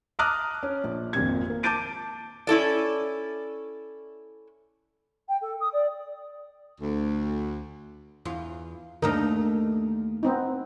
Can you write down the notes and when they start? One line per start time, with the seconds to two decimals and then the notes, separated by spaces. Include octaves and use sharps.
0.19 A5 A#5 D6 D#6 F6 F#6
0.63 C#4
0.84 A#1
1.13 G#1 F2 A#2 G#6
1.50 A#3
1.63 A5 D6 G6 A6 D7 D#7
2.47 C#4 E4 A4 D5
5.28 G5
5.41 A4
5.60 D#6
5.72 D5
6.80 D2
8.25 E2 F4
9.02 D#2 D3 A3 D#4 A#4
10.23 B3 C4 D#4